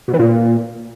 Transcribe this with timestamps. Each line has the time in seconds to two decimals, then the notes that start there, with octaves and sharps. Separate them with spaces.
0.08 B2
0.13 E3
0.19 A#2